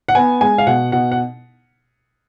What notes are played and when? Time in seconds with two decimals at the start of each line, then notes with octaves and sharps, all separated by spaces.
0.09 F#5
0.15 B3 G#5
0.41 G#3 G#5
0.58 F5
0.67 B2 F#5
0.92 B2 F#5
1.12 F#5